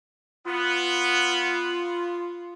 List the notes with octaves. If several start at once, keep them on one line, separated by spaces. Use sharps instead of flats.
B3 F4